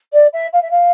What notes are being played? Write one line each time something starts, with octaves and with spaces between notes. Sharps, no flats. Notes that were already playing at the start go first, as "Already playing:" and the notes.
D5
E5
F5
E5
F5